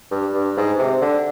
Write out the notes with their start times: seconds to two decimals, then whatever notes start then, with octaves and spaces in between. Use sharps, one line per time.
0.11 G2
0.34 G2
0.57 G#2
0.79 C3
1.01 D3